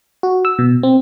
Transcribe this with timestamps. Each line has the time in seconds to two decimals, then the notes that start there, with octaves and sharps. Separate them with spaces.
0.23 F#4
0.45 E6
0.59 B2
0.83 C4